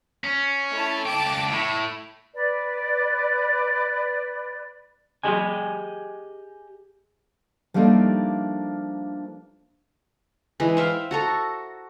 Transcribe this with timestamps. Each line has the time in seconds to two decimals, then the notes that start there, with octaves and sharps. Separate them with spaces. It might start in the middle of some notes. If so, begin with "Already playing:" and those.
0.24 C#4
0.72 A3 E4 A5
1.06 C#2 G5 A5 D6
1.50 A2 E4 E5
2.34 B4 D5
5.23 G4 G#4 D#5 G#5
7.74 F3 G3 A3 A#3 D4 D#4
10.60 E3 G#3
10.77 C5 E5 F5 G5
11.11 F#4 A4 A#5